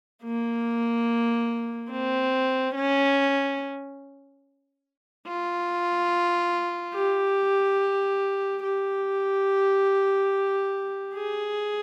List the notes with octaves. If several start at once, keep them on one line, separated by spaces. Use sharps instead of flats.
A#3
C4
C#4
F4
G4
G4
G#4